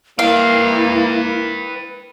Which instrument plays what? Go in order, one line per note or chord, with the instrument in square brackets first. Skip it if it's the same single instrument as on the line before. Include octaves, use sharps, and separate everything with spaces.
[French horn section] E3 G3 A#3 [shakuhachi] E4 [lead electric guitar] B4 G5 [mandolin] F5